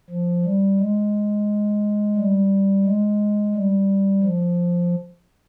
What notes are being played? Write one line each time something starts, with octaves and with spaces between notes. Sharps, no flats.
F3
G3
G#3
G3
G#3
G3
F3